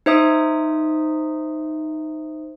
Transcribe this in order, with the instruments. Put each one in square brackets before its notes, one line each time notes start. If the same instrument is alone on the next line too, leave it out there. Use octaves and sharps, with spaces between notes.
[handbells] D#4 C5 E5 D#6